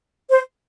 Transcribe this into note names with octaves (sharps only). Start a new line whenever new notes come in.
C5